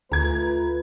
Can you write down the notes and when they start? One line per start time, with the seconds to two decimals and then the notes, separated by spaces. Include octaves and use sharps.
0.12 D2 A3 F4 B4 A#5 G#6